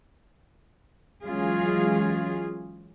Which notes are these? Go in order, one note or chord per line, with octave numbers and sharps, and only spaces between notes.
E3 F#3 G#3 C#4 F4 G#4